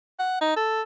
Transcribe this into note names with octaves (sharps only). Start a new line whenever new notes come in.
F#5
D#4
A4